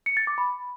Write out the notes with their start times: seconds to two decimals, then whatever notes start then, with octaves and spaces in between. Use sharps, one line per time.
0.06 C#7
0.17 A6
0.27 D6
0.38 B5